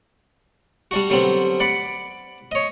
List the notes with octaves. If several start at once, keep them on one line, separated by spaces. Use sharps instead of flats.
G3 D4 F#4
D3 F#3 G3 B3 C4
D5 F#5 B5 D6
C#5 D#5